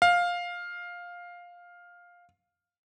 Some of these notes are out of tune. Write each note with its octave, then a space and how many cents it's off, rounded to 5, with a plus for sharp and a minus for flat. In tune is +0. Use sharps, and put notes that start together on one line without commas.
F5 +10